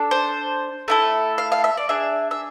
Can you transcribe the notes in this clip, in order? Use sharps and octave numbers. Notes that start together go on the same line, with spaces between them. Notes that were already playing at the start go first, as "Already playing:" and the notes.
Already playing: D4 A4
C5
A3 E4 A4
F5
F5
E5
D5
D4 G#4 E5
E5